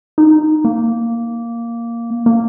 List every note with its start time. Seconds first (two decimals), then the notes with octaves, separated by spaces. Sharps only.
0.18 D#4
0.65 A#3
2.26 A#3